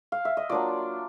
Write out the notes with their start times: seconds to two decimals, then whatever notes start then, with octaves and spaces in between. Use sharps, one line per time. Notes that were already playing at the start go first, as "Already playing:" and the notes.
0.12 F5
0.25 E5
0.37 D#5
0.49 F#3 A#3 D4 F4 D5